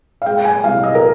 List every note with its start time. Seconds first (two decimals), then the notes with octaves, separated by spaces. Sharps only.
0.22 F5
0.26 G#3 G5
0.45 G#5
0.64 C2 F5
0.83 D#5
0.95 A#4